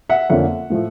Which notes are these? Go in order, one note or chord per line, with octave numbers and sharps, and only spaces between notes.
E5 F#5
F2 D3 F3 A#3 C#4 E5 F#5
A2 F3 A3